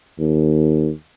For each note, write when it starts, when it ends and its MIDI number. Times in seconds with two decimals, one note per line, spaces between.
0.19 0.90 39